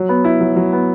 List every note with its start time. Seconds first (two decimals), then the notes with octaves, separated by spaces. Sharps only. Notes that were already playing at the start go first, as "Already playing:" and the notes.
Already playing: F#3
0.09 B3
0.24 E4
0.40 F#3
0.56 F#3
0.73 B3